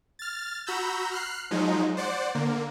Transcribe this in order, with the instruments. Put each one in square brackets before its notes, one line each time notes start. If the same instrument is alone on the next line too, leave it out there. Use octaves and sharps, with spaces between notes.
[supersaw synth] F6 A6
F#4 A#5 B5 E6 G6
F6 F#6 C7
F3 F#3 G#3 D#4
C5 D5 F#5
D3 A#3